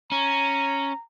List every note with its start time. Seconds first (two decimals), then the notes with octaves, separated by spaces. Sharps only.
0.12 C#4 A#5